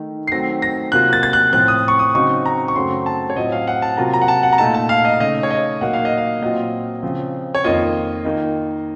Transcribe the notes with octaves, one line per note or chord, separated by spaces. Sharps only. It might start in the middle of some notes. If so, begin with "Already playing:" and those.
Already playing: D#3 A3 D#4
C7
D#3 F#3 A3 C4 A#6
A#6
C3 F#3 A#3 F4 F#6
A6
A6
F#6
A2 F3 C4 F4 F#6
D#6
C#6
D#6
C#3 F#3 C4 D#4 C#6
A#5
C#6
F#2 C#3 F#3 A3 C4 C6
A5
C#5
A2 F#3 C4 F4 D#5
F5
F#5
A5
C3 F#3 A#3 F4 A#5
A#5
F#5
A5
F#5
A#5
A#2 A3 D#4 A5
A5
F5
D#5
C#3 A3 D#4 D#5
C#5
D#5
A#2 F#3 A#3 D#4 F#5
F5
D#5
F5
A#2 F#3 C4 F4 D#5
C#3 F3 C4
C#5
F2 D#3 A#3 F4 D#5
D#3 A#3 D#4